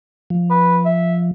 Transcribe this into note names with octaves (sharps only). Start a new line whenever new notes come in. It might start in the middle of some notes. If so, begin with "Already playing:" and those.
F3
B4
E5